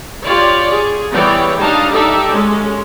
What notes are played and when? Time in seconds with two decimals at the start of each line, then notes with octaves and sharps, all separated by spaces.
0.25 F4 G4 C#5 D5
0.71 G#4
1.12 E3 G3 B3 C#5 D5 G5
1.58 G3 D4 D#4 D#5 F5 A5
1.93 D#4 G4 A4 D5 E5
2.31 G#3 C#4